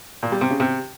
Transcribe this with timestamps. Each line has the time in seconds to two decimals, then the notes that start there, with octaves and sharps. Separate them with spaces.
0.23 A#2
0.32 G3
0.41 C3
0.51 C#3
0.60 C3